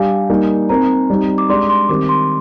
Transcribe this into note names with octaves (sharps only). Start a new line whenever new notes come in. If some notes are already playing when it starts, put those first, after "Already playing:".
Already playing: G3 D4 G4 F5 G#5
G3 A#3 D#4
C4 D#4 A#4 A#5
G3 C4 D#4
D6
G#3 D4 G4 D5 C6
C6
D#3 G3 C4 G4 A#4 D6
C6